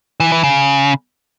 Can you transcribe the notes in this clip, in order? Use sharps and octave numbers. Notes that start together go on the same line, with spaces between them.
E3
E3
C#3